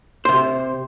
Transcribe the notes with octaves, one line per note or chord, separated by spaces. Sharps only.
C3 C5